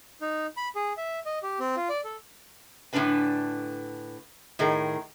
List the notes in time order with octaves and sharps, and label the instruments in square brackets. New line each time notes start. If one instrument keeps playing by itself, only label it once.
[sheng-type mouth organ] D#4
B5
G#4
E5
D#5
G4
C4
F4
D5
A4
[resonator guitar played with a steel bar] A2 D3 C4 D4 B4 G#5
A2 D#3 G#4 A#4